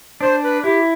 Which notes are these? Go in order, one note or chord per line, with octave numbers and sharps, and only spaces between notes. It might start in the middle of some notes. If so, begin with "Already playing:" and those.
D4 C5
B4
E4 G4